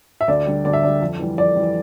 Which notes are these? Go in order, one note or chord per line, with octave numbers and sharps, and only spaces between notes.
E5
D2 D5
D3 G3
D2 D5
E5
D3 G3 D5
F2
E3 G3
F2 D5
E3 G3